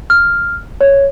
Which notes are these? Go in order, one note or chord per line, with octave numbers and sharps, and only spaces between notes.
F6
C#5